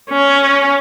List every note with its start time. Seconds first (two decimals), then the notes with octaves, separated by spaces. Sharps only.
0.10 C#4